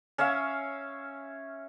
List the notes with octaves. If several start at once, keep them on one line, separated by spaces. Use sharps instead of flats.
C#4 C#5 E5 F5